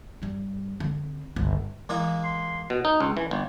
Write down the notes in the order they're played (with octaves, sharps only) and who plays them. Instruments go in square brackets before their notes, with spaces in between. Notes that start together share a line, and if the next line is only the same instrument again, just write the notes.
[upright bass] G2 G3
D3 C4
G1 C#2
[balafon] E3 E4 [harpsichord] G#3 A#3 A#5
[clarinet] C6
[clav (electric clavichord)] B2
D#4
C#2
E3
G1